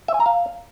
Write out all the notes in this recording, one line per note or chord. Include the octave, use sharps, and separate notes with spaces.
E5
G#5
A#5
F5